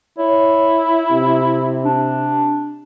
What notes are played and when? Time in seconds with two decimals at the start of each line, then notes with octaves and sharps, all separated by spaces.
0.19 E4 C#5
1.12 C3
1.84 D4